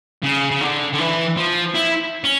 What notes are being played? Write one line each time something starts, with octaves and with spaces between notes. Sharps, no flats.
C#3
C#3
D3
D3
E3
F3
E4
C#4